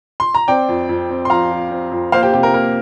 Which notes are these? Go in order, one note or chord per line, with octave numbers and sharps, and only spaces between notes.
C6
A#5
C4 D5 G5
F2
F2
C4
C6
F3 F5 A#5
F3
C4
F2
A#3 C5 F5
G4 C5
C3 G4
A#4
A#3 A#4